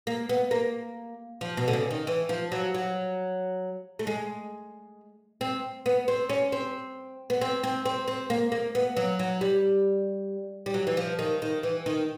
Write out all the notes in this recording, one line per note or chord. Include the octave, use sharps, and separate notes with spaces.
A#3
B3
A#3
F3
B2
D3
C#3
D#3
E3
F3
F#3
F#3
A3
G#3
C4
B3
C4
C#4
C4
B3
C4
C4
C4
C4
A#3
A#3
B3
F#3
F#3
G3
G3
F#3
E3
F3
D#3
D#3
E3
D#3